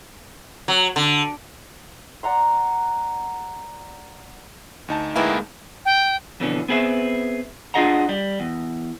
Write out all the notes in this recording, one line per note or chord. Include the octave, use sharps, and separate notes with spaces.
F#3
D3
D5 F#5 A#5 C6
D2 D#4 A5
D#3 E3 G#3 A#3 B3 E4
G5
F2 B2 D3 E3 C#4
B3 C4 G#4 B4 E5
D4 F4 G#4 D#5 F#5 A#5
G3
E2